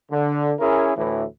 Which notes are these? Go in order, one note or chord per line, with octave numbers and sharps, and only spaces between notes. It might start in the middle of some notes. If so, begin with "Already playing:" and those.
D3
C#4 E4 G#4 A#4
D2 A2 E3